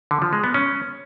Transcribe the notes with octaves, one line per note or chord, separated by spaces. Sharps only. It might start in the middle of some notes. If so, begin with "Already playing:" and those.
D3
F3
G#3
B3
C#4